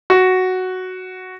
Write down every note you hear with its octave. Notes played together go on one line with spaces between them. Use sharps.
F#4